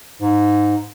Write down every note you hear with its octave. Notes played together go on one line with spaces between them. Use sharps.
G#2